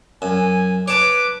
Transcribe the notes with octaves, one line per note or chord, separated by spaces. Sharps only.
F#2 G#5
B4 C#5 A5 D6